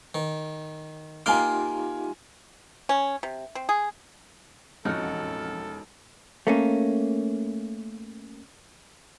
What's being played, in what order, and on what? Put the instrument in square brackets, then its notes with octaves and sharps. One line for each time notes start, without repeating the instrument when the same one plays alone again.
[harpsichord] D#3
[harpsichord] A#3 C6 D6 [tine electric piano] D#4 F4 G4 [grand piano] G#5 F6
[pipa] C#4
C3
C4
G#4
[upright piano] E1 F6 [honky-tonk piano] A1 F2 [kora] D#4 F#4 [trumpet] A4
[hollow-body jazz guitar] A3 A#3 C#4